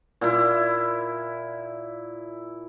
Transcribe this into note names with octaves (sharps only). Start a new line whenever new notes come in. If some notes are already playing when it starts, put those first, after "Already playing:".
A#2 E4